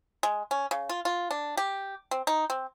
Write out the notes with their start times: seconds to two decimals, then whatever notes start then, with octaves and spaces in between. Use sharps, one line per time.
0.23 G#3
0.51 C#4
0.71 C#3
0.89 F4
1.05 F4
1.31 D4
1.57 G4
2.11 C4
2.27 D#4
2.50 C4